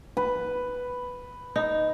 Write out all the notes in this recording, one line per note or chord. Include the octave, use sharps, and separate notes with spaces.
B4
D#4